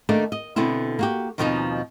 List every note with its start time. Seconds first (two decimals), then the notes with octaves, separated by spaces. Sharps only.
0.09 D#3 A3 A#3 D4
0.32 D#5
0.56 B2 D3 B3 C4 E4
0.99 A#3 F#4 G4
1.38 D#2 B2 F3 B3 C4 D#4